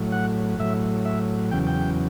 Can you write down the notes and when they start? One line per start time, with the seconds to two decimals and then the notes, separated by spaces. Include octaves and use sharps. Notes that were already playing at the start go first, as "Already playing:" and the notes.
Already playing: A2 F#3
0.12 F#5
0.59 A2 F#3 E5
1.05 E5
1.51 E2 C#3 F#3 G5
1.67 G5